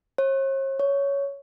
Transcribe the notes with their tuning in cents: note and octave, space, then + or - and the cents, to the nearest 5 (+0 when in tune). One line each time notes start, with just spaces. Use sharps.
C#5 -45
C#5 +10